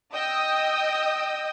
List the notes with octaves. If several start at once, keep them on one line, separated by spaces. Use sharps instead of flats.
D#5 G5 D#6 E6